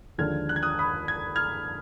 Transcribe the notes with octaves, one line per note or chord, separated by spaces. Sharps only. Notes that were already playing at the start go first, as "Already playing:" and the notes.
D#2 D3 F3 G#3 D4 F6 G#6
F#6
G#6
D#6 F#6
B5 D#6
G#6
F6 G#6